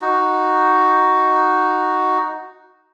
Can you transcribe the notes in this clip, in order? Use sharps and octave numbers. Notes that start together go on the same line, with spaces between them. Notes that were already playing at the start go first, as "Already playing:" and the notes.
D#4 F#4